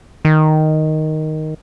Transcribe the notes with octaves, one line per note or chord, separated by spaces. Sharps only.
D#3